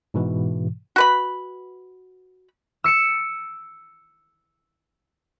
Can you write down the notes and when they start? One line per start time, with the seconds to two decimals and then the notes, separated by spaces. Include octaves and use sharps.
0.14 G#2 B2 E3
0.96 F#4 B4 B5
2.84 E6 C#7 D7 E7